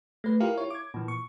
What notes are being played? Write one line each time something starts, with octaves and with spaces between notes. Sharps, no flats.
A3 B4
E4 F4 G4 A#4 F5
E4 C#5
D6 G#6
A#2 E3
C#6